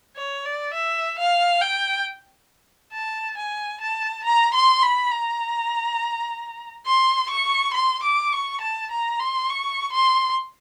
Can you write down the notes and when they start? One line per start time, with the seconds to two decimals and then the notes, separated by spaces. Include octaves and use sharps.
0.16 C#5
0.45 D5
0.74 E5
1.18 F5
1.61 G5
2.92 A5
3.37 G#5
3.81 A5
4.25 A#5
4.54 C6
4.83 B5
5.11 A#5
6.86 C6
7.30 C#6
7.74 C6
8.03 D6
8.33 C#6
8.61 A5
8.91 A#5
9.20 C6
9.49 C#6
9.93 C6